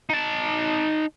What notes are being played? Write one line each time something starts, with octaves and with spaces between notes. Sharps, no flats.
D#4 A5